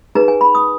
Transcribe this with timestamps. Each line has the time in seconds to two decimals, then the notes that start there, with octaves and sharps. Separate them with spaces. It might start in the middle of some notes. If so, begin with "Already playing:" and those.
0.15 D#4 G#4 B4 A#5
0.28 G#5
0.41 B5
0.55 D#6